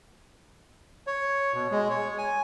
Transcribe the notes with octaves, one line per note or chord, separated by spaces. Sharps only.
C#5
B2
G#3
C#5
G#5